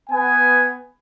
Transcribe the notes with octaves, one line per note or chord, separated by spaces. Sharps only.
B3 G#5